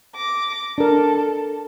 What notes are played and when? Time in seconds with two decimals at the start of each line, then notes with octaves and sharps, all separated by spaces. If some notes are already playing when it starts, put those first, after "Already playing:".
0.16 D6 A#6
0.78 D4 A4 A#4